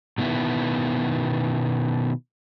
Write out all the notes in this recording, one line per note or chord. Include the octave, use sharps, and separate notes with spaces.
B2 D#3 B3 E4